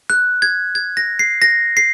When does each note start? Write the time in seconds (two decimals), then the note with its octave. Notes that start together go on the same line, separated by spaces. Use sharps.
0.10 F#6
0.42 G#6
0.75 G#6
0.97 A#6
1.19 C7
1.42 A#6
1.77 C7